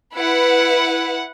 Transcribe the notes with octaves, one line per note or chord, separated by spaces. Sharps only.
E4 B4 F#5